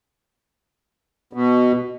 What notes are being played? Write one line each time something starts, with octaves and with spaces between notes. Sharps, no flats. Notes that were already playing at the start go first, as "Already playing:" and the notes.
B2